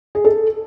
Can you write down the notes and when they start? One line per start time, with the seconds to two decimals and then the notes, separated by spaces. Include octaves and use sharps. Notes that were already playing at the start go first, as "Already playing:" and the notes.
0.15 G#4
0.25 A4